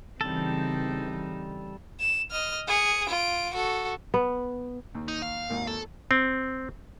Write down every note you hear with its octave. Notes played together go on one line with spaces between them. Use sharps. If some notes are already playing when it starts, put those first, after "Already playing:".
C#3 E3 G3 C4 D#4 A4
E7
D#5 F6
G#4 C#7
F4 D7
F#4 A4
B3
D#2
D#4
F5
G#1 D#2 A#4
A4
C4